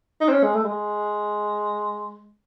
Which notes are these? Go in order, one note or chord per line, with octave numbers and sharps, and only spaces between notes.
D#4
C4
C#4
G#3
A3
G#3